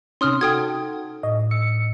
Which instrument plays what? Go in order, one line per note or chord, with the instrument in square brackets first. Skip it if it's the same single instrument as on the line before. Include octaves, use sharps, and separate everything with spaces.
[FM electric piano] C3 C#4 [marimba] D#4 [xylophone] C6 D#6 F6
[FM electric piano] F#4 A4 [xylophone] G5 D#6 G#6
[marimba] A2 [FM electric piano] D#5
[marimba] E6 [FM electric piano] C#7